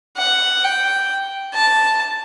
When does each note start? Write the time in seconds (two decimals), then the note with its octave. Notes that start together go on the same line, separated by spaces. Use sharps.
0.18 F#5
0.64 G5
1.55 A5